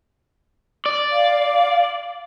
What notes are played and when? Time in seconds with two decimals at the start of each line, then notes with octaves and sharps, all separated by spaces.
0.86 D5
1.12 F5